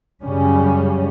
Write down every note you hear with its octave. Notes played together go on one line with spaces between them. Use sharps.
F#2 C#3 G3 C#4